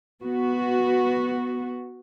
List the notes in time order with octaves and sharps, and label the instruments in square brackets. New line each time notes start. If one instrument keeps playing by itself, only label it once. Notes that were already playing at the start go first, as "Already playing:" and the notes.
[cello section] B3 F#4